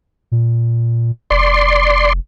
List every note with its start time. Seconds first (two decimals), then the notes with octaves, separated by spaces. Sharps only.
0.32 A#2
1.30 F1 D5 C6